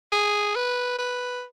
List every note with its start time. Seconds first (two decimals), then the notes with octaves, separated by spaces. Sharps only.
0.12 G#4
0.56 B4
0.99 B4